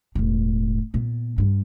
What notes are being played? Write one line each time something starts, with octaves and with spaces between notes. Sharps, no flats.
E1 A2
A#2 B3
G2